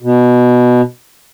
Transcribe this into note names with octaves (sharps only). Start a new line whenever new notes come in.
B2